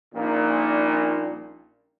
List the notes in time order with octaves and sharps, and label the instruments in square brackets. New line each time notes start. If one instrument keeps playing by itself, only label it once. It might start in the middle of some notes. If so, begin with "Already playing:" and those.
[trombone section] A#1 A#2 [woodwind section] G3 C#4 D#4